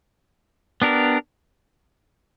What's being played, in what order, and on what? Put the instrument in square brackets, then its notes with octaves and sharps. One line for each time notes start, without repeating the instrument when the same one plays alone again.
[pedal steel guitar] B3 D4 G4 A#4